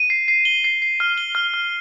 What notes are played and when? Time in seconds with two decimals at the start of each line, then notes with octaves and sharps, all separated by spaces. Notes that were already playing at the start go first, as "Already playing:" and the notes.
Already playing: D#7
0.10 C7
0.28 C7
0.45 G7
0.64 C7
0.82 C7
1.00 F6
1.18 G7
1.35 F6
1.54 F6